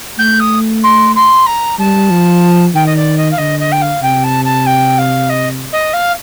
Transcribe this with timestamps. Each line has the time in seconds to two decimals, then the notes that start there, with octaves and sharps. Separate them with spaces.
0.19 A3 G6
0.40 D#6
0.83 C6
1.15 C6
1.46 A#5
1.79 G3 A5
2.10 F3
2.74 D#3 G5
2.86 D#5
2.96 D5
3.17 D#5
3.31 F5
3.38 D3 D#5
3.60 D#5
3.72 G5
3.82 F5
4.02 C3 G5
4.24 A5
4.45 A5
4.66 G5
4.98 F5
5.29 D#5
5.73 D#5
5.93 F5